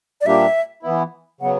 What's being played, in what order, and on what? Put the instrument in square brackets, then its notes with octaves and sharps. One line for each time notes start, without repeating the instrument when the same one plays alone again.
[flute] D5
[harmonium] A#2 G3 A#3 D4 G4 [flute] E5
[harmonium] E3 B3 E4
[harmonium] C#3 F#3 B3 [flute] F#5